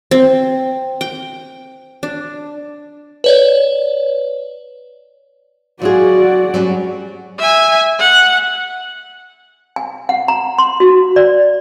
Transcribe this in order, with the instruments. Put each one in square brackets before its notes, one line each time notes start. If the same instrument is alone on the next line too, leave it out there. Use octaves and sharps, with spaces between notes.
[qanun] C4
G5
D4
[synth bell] B4 C#5 D5
[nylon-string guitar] F#3 F4 G#4 [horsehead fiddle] F#4 D5
[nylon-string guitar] F#3 G3 C#4
[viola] E5 G#5
F#5
[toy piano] G#5
F#5
A#5
C6
F#4
D5